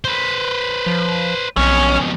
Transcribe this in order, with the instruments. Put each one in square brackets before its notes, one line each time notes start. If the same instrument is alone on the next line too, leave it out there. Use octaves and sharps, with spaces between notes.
[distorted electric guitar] B4 C5
[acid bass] F3
[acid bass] B1 [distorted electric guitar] F2 B2 [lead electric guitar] C#4